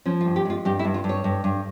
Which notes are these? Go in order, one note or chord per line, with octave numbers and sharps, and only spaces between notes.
F3 C#4
F4
G2
G4
G#3 F4
G2 G4
E4
G2
F4
G2
C#5
G2
G2